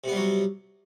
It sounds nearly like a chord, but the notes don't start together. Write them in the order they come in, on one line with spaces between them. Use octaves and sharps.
C3 B3 G3 F#3